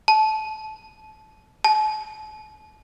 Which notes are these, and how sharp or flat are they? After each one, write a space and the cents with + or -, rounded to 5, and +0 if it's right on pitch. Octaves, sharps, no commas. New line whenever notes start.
A5 -25
A5 -45